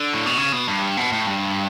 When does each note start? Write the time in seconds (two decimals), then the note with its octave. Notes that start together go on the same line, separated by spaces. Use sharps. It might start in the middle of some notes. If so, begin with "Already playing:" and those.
Already playing: D3
0.14 A2
0.26 B2
0.38 C#3
0.52 B2
0.68 G2
0.97 B2
1.12 A2
1.27 G2